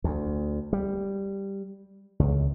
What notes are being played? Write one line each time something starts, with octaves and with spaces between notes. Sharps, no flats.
D2
G3
C#2